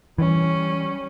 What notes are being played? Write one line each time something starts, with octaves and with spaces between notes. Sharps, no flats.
E3 G3 C#4